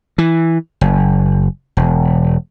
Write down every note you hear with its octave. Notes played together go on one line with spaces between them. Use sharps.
E3
F#1
E1